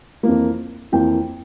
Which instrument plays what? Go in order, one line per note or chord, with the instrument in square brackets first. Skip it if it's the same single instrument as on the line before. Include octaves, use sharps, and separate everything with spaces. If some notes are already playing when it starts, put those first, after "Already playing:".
[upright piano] F2 E3 A#3
F2 E3 A#3 G5